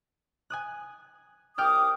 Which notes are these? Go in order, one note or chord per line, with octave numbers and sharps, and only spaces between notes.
G#5 D#6 F#6
C2 G5 D6 D#6 F6 F#6